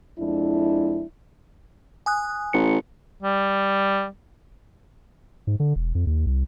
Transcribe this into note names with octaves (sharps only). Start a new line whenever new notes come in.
F2 G#3 D4 E4
G#5 D#6 F#6
A1 C#7
G3
G#2
D3
E1
F2
D#2
C2